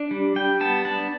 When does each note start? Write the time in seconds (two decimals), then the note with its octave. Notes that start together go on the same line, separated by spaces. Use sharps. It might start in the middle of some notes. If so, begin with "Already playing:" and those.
Already playing: D4
0.11 G3
0.36 G3 G5
0.60 B3 A5
0.85 D4 A5